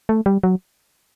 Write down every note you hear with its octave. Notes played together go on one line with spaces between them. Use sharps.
A3
G3
F#3